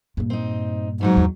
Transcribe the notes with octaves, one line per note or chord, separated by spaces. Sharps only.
G2 A#2
C4 D#4
F2 G#2 E3 F#3
E2